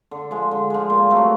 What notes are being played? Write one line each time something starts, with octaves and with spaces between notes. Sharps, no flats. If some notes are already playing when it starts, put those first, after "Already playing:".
D3
F3 G#3
D3
F3 G#3
A#2
F#3 A3 C4